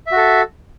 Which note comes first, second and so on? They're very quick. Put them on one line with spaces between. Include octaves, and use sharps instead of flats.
E5 F#4 A4